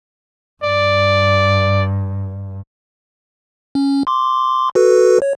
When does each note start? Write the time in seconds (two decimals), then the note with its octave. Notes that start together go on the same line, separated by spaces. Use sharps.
0.64 G2 D5
3.75 C#4
4.07 C6 D6
4.75 F#4 A4 B4
5.22 C#5